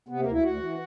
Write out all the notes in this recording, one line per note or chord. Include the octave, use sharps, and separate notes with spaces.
C3 B3
A#3
D2
E4
D2 F#4
E3